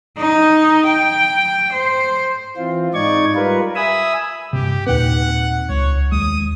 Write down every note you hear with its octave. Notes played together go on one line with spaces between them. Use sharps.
D#4
G5
C5
E3 C4 F4
G#2 D#4 D5 C#6 G#6
G3 F4 A#4 B4
E5 G#5 B5 D#6 E6
G2 C3 G4
D#2 A#2 C4 B4 F#5
C#2 C#5
D#2 G#3 D#6